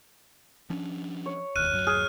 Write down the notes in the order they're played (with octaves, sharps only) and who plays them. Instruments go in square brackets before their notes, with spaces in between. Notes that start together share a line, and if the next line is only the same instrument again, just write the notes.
[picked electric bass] F3 C#4 D4
[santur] C#5
[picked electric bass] E1 D#2 [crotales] F6 F#6 D#7
[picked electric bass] D1 F#2 F#3
[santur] G#4 [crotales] F6 D#7